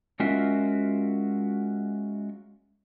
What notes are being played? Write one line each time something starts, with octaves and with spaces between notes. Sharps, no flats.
G#3 C#4 F4 F#4 A#4 E5